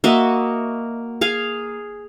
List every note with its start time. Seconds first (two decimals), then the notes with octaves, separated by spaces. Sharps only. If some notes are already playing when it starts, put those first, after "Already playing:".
0.04 A#3 F#4 D#5 E5
1.21 G#4 F5 G#5